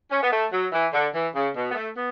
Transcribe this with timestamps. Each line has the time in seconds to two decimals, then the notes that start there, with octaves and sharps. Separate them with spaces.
0.11 C#4
0.22 B3
0.31 A3
0.52 F#3
0.72 E3
0.93 D3
1.13 E3
1.34 C#3
1.55 B2
1.71 B3
1.75 A3
1.96 B3